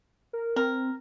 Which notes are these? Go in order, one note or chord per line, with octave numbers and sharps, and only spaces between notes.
A#4
C4 A#4